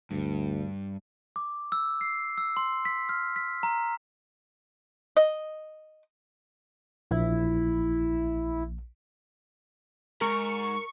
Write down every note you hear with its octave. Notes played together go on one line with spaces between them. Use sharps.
D2 G2
D6
E6
C7
E6
C6
B6
F6
B6
A#5
D#5
A#1 E4
G#2 A#4 C#6